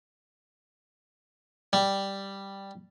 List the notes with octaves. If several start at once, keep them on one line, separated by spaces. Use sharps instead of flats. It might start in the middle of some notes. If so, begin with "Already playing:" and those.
G3